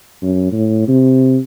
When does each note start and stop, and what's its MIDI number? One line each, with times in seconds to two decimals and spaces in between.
0.23 0.49 42
0.52 0.83 45
0.88 1.38 48